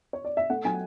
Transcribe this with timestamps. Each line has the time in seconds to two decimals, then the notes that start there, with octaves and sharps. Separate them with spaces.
0.13 C#5
0.25 D5
0.37 E5
0.50 A3 F#5
0.65 F#3 G#5